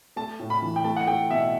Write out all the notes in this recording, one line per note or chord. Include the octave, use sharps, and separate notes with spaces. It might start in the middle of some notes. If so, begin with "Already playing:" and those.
A3 A5
A2
B5
E3
G5
A3 A5
F#5
A3 G5
B2 E5